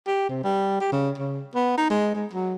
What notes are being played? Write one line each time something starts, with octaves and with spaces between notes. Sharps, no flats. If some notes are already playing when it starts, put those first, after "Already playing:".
G4
C3
G3
G4
C#3
C#3
B3
D#4
G#3
G#3
F#3